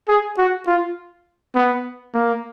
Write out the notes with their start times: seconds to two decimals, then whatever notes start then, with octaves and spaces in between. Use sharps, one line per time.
0.08 G#4
0.38 F#4
0.67 F4
1.55 B3
2.14 A#3